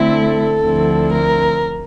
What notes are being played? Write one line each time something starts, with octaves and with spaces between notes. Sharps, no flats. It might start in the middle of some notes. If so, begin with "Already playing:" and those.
Already playing: D3 A3 C4 E4
A4
D2 D3 F3 C4 E4
A#4